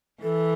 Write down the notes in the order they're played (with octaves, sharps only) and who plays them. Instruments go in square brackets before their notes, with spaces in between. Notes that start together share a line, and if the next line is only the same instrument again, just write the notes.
[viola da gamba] E3 [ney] A4